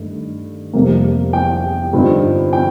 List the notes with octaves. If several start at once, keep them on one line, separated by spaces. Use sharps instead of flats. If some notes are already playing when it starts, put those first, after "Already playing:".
Already playing: G2 D#3 A3
F1 F2 C3 G3 A#3
G5
G2 D3 F3 C4 D#4
G5